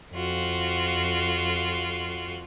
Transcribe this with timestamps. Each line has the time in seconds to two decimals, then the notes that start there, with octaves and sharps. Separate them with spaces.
0.13 F2 F4 F#4